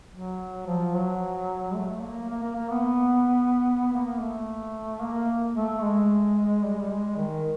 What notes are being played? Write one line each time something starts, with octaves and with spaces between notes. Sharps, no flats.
F#3
F3
F#3
A3
A#3
A#3
A#3
A#3
B3
A#3
A3
A#3
A3
G#3
G3
G#3
G3
G#3
D#3